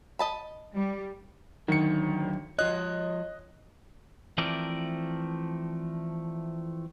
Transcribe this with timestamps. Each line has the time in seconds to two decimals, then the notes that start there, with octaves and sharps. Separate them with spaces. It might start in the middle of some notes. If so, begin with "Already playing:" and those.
0.19 D#5 A5 B5
0.76 G3
1.68 D3 D#3 F#3 C#7
2.59 F3 F4 C#5 D#5 F#6
4.38 E3 F3 A3 C4 A#4 D5